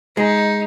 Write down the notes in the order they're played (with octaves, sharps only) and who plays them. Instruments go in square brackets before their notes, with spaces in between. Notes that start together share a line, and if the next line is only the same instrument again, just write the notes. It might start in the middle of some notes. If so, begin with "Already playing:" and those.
[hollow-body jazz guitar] G#3 [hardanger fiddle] D#4